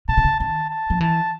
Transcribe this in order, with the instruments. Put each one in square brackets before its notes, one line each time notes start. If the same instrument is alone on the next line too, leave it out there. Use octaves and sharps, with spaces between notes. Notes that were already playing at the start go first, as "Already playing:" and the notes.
[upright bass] B2 [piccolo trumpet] A5
[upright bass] C3
C#3
[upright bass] D#3 [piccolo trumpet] A5
[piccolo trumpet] A5
[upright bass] F3
[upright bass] E3 [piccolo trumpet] A5